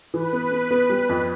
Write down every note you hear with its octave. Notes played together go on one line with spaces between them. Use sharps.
E3 B4
B3
B3
B3
G3
F2